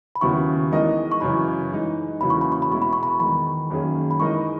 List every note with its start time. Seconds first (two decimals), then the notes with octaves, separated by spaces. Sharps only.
0.16 B5
0.21 D#2 C#3 F#3 B3 E4 C#6
0.72 E3 G#3 D#4 A#4 D#5
1.12 C#6
1.21 F#2 C#3 E3 B5
1.71 E3 G#3 D#4
2.20 E2 C#3 F#3 A#3 E4 B5
2.30 C#6
2.41 B5
2.52 C#6
2.62 B5
2.70 B2 G#3 B3 E4 C#6
2.82 B5
2.93 C#6
3.03 B5
3.20 E2 D#3 G#3 D#4 B5
3.70 F#2 D#3 A#3 C#4 G#4
4.11 B5
4.20 E3 G#3 D#4 A#4 D#5 C#6